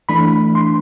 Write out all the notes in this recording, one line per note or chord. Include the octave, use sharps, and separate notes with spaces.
E3 A3 D4 B5
C6